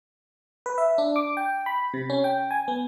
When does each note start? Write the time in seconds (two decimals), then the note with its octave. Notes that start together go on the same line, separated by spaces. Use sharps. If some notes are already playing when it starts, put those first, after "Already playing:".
0.66 B4
0.78 E5
0.98 D4
1.16 D6
1.37 G5
1.66 B5
1.94 C3
2.10 C#4
2.24 G5
2.51 G#5
2.68 B3